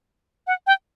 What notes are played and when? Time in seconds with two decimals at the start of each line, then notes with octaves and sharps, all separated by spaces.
0.47 F#5
0.67 G5